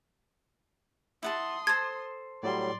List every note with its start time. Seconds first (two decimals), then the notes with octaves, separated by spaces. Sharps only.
1.23 E4 F#5 A5 C6 D#6
1.67 A4 C5 G#6
2.43 A2 F#3 G3 D5 C6